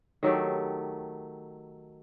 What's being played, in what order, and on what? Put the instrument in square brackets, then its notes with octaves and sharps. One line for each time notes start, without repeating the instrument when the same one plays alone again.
[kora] D#3 F#3 A3 G4